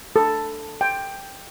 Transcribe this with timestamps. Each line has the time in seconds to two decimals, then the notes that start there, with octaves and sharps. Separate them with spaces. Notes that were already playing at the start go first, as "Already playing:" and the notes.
0.16 A4
0.81 G5